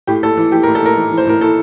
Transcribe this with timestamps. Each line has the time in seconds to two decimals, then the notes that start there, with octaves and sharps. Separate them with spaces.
0.07 A2 G4
0.23 A2 A4
0.37 E3
0.52 E3 G4
0.63 A#4
0.67 A2
0.75 A4
0.82 A2 A#4
0.97 E3
1.12 E3
1.17 C5
1.27 A2 A#4
1.41 A2 A4